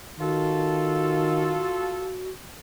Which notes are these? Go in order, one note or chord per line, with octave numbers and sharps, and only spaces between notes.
D#3 F4 F#4 A4